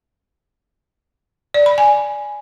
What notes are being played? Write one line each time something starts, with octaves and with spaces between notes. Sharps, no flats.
D5
B5
G#5